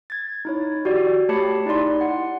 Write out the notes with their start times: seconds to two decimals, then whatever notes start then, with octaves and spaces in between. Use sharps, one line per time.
0.10 G#6 A6
0.45 D#4 E4 C#5
0.85 F#4 G4 D5
1.29 A3 G4 C#5 A5 B5 C#7
1.66 D#4 E4 G4 D5 C6
2.01 F#5